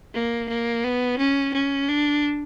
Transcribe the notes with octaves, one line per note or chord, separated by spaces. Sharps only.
A#3
A#3
B3
C#4
C#4
D4